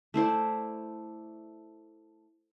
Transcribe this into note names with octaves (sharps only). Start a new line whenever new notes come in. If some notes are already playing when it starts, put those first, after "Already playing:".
A3 E4 C5 D5